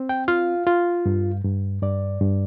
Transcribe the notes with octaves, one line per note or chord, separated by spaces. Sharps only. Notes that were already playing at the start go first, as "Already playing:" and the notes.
Already playing: C4
G5
F4 F5
F4
G2
G2
G2 D5
G2